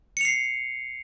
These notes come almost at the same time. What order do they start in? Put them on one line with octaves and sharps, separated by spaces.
C#7 F7 C7